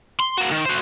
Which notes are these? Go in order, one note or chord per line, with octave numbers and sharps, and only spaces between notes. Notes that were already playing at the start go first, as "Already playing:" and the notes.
C6
A#3 F#4
D#3
F#4 C5